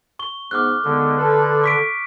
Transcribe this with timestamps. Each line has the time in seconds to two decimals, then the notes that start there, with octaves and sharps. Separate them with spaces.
0.19 C#6 G7
0.51 G#2 B3 D6 F6 F#6
0.85 D#2 D3 G#3 B3
1.18 A4 B4
1.64 C#6 B6 D7